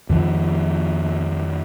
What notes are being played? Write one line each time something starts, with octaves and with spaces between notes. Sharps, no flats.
F2 D#3 F3